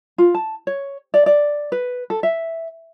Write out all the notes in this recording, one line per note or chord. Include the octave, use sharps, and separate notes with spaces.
F4
A5
C#5
D5
D5
B4
A4
E5